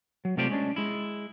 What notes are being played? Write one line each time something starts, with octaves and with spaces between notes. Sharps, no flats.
F#3
C3 A3 F4 G4 C5 D5
G#3 C#4 D4
G#3 E4